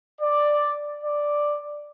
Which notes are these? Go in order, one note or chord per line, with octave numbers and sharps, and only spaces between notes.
D5
D5